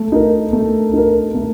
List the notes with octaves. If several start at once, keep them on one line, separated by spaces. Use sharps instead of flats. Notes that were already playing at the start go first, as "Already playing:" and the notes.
Already playing: A3
D#4 A#4
A3
D#4 A#4
A3